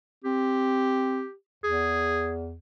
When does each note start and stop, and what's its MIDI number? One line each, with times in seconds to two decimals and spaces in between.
0.24 1.24 60
0.24 1.33 67
1.64 2.57 40
1.64 2.32 68